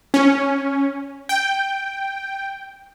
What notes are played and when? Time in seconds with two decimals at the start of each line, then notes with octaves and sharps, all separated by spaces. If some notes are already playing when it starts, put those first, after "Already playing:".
0.14 C#4
1.29 G5